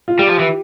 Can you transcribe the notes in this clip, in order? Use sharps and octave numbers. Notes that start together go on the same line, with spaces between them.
F4
G3 G4
F3
E3